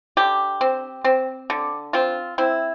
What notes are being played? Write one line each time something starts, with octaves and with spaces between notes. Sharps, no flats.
D3 G4
C4
C4
D3
C4 F4
C4 E4